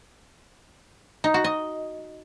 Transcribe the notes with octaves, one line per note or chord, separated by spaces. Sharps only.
D#4
F#4
D#5